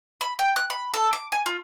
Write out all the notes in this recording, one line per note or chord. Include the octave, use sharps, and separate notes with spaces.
B5
G5
F#6
B5
A4
D6
G#5
F4